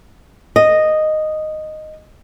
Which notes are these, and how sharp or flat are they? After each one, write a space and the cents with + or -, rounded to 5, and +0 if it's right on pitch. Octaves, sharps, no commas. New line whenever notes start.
D#5 -5